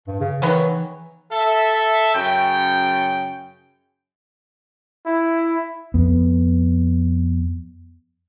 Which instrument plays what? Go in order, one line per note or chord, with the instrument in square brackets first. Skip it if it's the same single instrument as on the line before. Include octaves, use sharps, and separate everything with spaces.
[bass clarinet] G2
C#3
[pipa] D#3 B3 C#5 [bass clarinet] E3
[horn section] A4 E5
F#2 C#3 G5
[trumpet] E4
[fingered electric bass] F2 B3